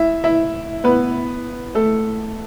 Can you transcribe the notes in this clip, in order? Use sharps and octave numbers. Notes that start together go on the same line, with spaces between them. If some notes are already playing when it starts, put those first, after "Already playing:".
Already playing: E4 E5
E4 E5
B3 B4
A3 A4